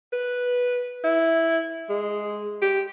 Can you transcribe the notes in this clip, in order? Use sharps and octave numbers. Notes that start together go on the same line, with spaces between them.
B4
E4
G#3
G4